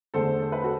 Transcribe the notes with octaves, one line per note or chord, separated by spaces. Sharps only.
E2 D3 A3 A4 C5
C5
B4
F#4 A4